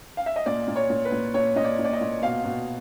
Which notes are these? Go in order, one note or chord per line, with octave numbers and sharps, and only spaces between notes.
F5
E5
D#5
A#2 D5
A#2
C#5
A#2
B4
A#2
A#2 C#5
A#2 D#5
D5
A#2
D5
D#5
A#2
B2 F5
B2